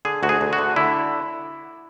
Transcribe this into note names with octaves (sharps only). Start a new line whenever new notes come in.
D3 G#4
D2 F#4
G#4
D2
F#4
D3
D3 E4